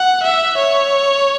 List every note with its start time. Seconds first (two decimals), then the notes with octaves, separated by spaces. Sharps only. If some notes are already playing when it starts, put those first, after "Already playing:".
Already playing: F#5
0.24 E5
0.58 C#5